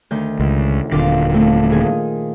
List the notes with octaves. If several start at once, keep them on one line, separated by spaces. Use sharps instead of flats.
D2 D#3 G6
C#2
D#1 D3 F4 A#4 D6
F2 A3
A#2 D#3 G#4